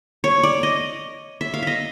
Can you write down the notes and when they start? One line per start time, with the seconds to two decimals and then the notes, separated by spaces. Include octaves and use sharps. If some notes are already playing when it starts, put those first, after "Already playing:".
0.24 C#5
0.43 D5
0.63 D#5
1.41 E5
1.54 F5
1.63 D#5 E5